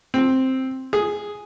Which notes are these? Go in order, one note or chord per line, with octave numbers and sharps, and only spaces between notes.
C4
G#4